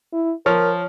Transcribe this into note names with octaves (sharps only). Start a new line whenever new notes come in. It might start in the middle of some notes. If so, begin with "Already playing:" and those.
E4
F3 A#4 C#5 F6